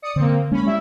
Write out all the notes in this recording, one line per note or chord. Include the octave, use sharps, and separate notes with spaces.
D5 D#6 C#7
D3 A#3 C4
G#3 A#3 C#4 B5
G3 E4 E5